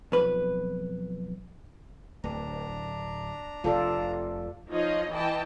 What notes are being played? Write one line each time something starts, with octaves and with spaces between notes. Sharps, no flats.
B1 F2 B4
D1 D4 A#5
F1 C3 F4 A4 D5
F3 D#4 F4 C#5 D#5
E3 E4 D#5 G5 A5